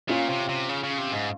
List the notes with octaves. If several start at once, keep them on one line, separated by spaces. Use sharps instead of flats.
A#2 C#4 F4
C3
C3
C#3
C#3
C3
G#2